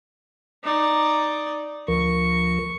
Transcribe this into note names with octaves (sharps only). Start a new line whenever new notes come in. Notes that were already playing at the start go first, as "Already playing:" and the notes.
D#4 D5
D2 F3 A#4 C#6